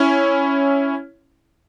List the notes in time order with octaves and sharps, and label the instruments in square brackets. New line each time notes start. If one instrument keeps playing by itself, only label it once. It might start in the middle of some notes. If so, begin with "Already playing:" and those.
Already playing: [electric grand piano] C#4 E4